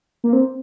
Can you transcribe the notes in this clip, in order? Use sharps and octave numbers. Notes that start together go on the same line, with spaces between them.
A#3
C4